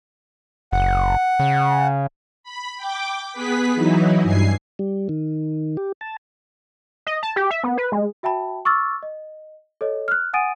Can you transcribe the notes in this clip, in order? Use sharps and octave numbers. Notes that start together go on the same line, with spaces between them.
F#1 F#5
C#3
B5
G5 D6
B3 G#4 B4 B6
E3 F#3 D#4 E4
G2 G#5 C7
G3
D#3
G4
A5
D#5
A5
G4
E5
B3
B4
G#3
F#4 E5 G5 A5 B5
C#6 D6 E6 F6 A6
D#5
A4 C#5 D#5
F6 F#6
F#5 G#5 D#6 A6 D7 D#7